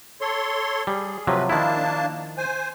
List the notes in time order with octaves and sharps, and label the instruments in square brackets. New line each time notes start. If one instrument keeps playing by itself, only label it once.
[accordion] A4 C#5 C6
[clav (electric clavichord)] G3 [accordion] G#4
[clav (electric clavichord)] C3 F3 F#3 [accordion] A3 B4
[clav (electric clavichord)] D#3 F3 E4 [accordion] A#3 D4 A5
[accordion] C5 G#5